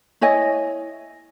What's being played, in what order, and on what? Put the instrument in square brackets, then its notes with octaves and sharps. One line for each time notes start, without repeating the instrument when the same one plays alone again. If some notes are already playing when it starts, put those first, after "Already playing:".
[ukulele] E4 C#5 D#5 G#5